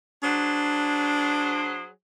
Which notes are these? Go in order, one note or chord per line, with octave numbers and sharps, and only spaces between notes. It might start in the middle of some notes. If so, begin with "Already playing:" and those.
F#3 D4 G#4 C5